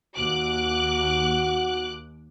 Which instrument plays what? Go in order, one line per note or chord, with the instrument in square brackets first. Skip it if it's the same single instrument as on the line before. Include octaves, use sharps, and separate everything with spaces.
[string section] D#2 D6 F#6 [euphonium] F#4